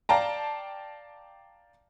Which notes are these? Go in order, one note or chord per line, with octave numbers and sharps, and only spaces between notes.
D5 F5 G5 A5 A#5